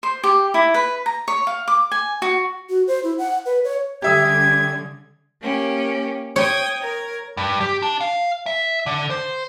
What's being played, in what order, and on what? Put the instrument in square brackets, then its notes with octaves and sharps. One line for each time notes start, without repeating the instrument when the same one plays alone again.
[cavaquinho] C5
G4
E4
B4
A#5
C#5
F5
D6
G#5
F#4
[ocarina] F#4
C5
E4
F#5
B4
C#5
[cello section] D3 G3 C#4 [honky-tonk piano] G4 E5 D#6 [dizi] G#6
[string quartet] A#3 C#4 G4
[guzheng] C#5 [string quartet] G5 D#6 G#6
[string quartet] A#4 G#6
[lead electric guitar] G2
G4
D4
F5
E5
D3
C5